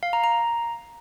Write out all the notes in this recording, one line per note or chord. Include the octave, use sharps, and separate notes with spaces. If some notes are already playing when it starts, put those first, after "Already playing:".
F5
A#5
A#5